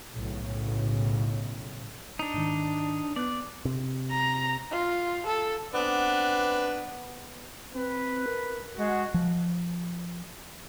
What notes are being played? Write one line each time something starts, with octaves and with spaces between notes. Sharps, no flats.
B1 A2 C#3
D4 D#4
G#2 D#3
B3 D5 F#6
C3
A#5
F4
A4
B3 C4 D4 B4
C4 B4
A#4
G#3 F#4 F#5
F3